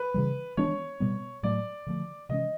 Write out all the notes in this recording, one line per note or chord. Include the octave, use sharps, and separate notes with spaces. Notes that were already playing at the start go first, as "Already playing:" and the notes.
Already playing: B4
C#3 E3 G3
E3 G#3 B3 D4 C#5
B2 G3 B3
A2 F#3 A3 D5
D3 F3 A3
C3 E3 G#3 C#4 D#5